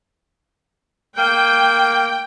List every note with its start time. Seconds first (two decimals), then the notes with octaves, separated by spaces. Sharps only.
1.18 A#3 G5